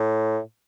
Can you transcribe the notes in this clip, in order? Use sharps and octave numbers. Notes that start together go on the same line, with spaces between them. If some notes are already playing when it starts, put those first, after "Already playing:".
Already playing: A2